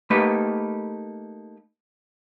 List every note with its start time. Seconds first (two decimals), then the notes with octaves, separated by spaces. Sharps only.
0.10 A3 A#3 D#4 G4 B4